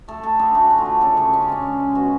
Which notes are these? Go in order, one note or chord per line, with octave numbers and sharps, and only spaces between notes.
A3 A4
A3 A4
D3 G#4
A3 F#4
D3
F4
D3
C#3 A4
C#3 G#4
G#3 C#4
D4
G#3 C#4
G#3
G#3
B2 F#4